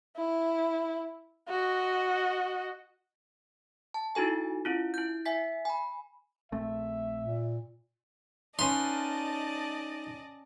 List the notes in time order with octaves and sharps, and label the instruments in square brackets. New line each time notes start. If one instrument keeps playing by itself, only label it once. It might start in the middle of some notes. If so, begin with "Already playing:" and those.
[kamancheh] E4
F#4 D#5
[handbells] A5
D#4 E4 F#4 A4 G#5
C#4 E4 F4
E4 G6
E5 G#5 B6
G#5 B5
[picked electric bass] A#1 A3 C4 [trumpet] E5
[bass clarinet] A#2
[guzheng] C#4 B4 F5 [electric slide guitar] D#4 [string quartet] D5 D#5 A5 [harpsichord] C6